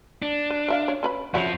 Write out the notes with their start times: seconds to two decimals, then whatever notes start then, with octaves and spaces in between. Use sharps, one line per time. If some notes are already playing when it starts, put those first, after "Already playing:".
0.22 D4
0.50 B4
0.68 A#4 E5 F5
0.88 C#5
1.03 C#4 B4 B5
1.34 F2 C#3 F3 E4 F#4